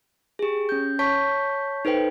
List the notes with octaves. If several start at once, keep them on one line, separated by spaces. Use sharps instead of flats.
G4 G#4
C#4 G6
C#5 A5 C#6 G6 B6
D#4 A4 B4 C5 G5